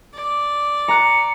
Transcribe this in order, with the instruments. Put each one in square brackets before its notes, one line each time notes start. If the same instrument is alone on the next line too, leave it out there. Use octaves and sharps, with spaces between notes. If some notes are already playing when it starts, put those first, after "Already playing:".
[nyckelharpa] D5
[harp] A#5 F#6 D7 [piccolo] C#7